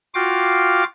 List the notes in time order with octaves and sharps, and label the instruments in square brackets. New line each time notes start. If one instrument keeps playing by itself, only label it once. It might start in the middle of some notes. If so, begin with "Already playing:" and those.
[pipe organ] F4 F#4 F5 G5 D6